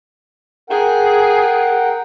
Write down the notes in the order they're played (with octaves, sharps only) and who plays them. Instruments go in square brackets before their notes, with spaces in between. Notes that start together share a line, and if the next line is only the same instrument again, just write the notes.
[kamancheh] G#4 [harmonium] A#4 F#5 G5